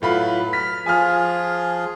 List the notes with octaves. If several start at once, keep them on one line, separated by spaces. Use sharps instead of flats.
A2 F#3 F4 B4 B5
F6 B6
F3 F4 G#4 G#5 F6